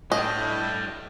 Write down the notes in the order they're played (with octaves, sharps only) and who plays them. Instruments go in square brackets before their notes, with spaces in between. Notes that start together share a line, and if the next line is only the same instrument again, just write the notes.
[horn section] A2 [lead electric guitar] G3 D4 [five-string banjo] D#5